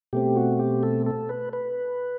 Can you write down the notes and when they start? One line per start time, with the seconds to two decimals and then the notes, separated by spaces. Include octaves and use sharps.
0.13 B2 A3 C4 G4
0.36 F#4
0.59 G4
0.83 A4
1.06 A4
1.29 B4
1.53 B4